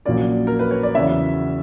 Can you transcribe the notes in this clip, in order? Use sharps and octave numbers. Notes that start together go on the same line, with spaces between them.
A#1 A#2 F#3 A#3 C#4 D5
A#4
B4
C#5
D5
E2 C#3 F#3 C#4 E5